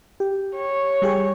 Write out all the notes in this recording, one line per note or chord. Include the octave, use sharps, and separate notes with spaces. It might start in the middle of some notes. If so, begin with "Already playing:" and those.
G4
C#5
G3 G4 G#4